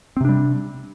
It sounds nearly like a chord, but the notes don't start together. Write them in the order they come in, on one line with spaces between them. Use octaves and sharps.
C4 C3 D4 G3